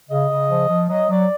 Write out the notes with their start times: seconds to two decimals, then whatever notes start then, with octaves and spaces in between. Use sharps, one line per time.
0.10 C#3 D#5
0.29 C#3
0.50 F3
0.69 F3
0.89 F#3 D#5
1.09 F#3 D5